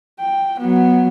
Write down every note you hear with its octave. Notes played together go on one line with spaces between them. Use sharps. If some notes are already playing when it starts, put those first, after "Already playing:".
G5
F#3 B3